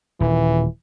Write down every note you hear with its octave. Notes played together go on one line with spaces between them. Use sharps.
D#1 E3